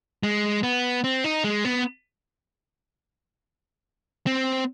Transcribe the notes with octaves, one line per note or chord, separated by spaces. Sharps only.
G#3
B3
C4
D#4
G#3
B3
C4